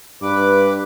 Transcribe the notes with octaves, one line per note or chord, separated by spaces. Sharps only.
G2 B4 D6